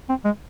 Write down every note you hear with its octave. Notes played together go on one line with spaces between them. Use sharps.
C4
G#3